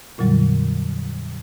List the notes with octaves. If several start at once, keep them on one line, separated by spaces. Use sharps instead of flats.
F2 A#2 D3 F#3 G3